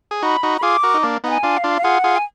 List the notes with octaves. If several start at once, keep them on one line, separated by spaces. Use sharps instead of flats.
G#4
D#4 F#4 B5
D#4 F#4
B5
F4 G#4 D6
F#4 A#4
D#4
A#3 D4
B3 D#4 F#5
G#5
D4 F4
F5
D4 F4
F5
F4 G#4 F#5
F4 G#4
G#5